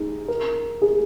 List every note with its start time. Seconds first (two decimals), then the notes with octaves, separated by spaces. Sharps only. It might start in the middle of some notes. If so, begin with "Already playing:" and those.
Already playing: D#4 G#4
0.28 A#4
0.82 G#4